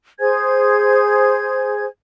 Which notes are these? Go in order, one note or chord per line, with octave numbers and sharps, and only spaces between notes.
G#4 C5 G#5 G#6